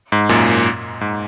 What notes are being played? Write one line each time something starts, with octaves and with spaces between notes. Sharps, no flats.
G#2
F#2 A#2
G#2